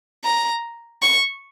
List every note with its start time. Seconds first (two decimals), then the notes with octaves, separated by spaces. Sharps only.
0.25 A#5
1.02 C#6